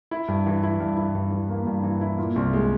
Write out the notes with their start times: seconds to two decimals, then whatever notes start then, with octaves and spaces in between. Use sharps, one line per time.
0.11 E4
0.28 G2
0.47 E3
0.63 E4
0.80 G2
0.97 E4
1.15 G2
1.32 E3
1.49 A#3
1.67 G2
1.84 E3
2.01 E4
2.18 A#2
2.36 C2
2.53 G#3